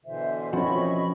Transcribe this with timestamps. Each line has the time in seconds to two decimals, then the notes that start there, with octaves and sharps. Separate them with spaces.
0.05 B2 D3 E3 C5 E5
0.53 F3 C4 C#4 F#4 D#5 B5 C#6